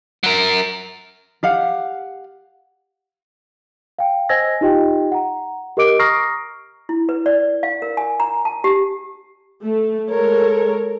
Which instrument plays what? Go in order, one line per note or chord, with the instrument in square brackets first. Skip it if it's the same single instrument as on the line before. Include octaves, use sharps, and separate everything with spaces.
[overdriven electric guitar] F#3 A#4
[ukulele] G4 F5 F#5
[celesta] F5 G5
C5 D#5 G#5 E6 G#6 A#6
D#4 F4 G4 D#5 G5
F#5 A#5
G4 A#4 D#5 D6 D7
A#5 C#6 D#6 F6 A#6 C7
[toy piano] E4
B4
D5
F5
A#4
G#5
A#5
A5
G4
[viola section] A3
G#3 A4 A#4 C#5